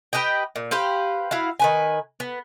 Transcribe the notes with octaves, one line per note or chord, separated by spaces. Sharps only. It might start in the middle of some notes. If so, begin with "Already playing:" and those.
G4 B4 D#5 G5
A#2
G4 B4 C5 F5
E4 F#4 F5
D#3 B4 G#5
B3